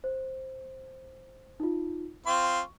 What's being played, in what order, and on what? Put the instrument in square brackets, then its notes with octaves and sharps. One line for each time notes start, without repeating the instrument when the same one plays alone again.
[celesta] C5
D#4 F4
[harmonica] C4 F4 C6 [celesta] C#6